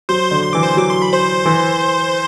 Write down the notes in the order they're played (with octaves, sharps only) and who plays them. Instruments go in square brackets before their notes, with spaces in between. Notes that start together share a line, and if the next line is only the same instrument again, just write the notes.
[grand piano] F#3 [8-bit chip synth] C5 C6
[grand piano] D3
[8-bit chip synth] C6
[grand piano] E3 [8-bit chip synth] D6
[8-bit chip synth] C5 C6
[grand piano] F#3 [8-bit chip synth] D6
[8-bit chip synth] C6
B5
C5 C6
[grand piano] E3